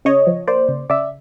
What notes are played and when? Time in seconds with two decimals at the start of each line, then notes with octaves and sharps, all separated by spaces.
0.05 C#3 C#5 D#5
0.27 F3
0.47 A#3 C5 D5
0.69 C#3
0.90 C#3 D5 E5